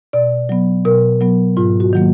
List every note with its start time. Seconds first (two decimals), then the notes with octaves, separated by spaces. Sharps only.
0.13 B2 D5
0.49 F#3 B3
0.85 B2 A#4
1.21 F#3 B3
1.57 G#2 F4
1.80 F#4
1.93 D#3 F#3 A#3